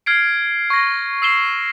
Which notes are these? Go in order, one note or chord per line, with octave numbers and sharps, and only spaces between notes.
F6 G#6 C7 D7
C#6 G#6 A#6
E6 C7 E7 G7